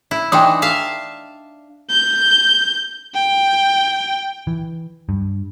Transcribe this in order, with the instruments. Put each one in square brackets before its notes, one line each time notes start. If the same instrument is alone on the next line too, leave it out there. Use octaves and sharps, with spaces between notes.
[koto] E4
[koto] E3 D4 D#4 [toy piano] G5 C6 D#6
[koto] E5 F5 A5
[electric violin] G6
G5
[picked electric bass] E3
G2